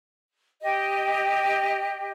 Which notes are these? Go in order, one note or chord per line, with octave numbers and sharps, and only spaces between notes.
G4 D#5